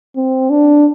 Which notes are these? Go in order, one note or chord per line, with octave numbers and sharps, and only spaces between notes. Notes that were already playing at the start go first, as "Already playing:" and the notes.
C4
D4